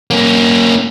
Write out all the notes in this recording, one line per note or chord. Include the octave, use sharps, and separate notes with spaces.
A#3 C#4